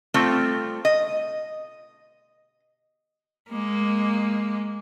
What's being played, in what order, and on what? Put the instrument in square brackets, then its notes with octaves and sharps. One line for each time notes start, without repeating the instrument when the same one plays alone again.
[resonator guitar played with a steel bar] G3 A3 C4 F4
D#5
[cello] G#3 A#3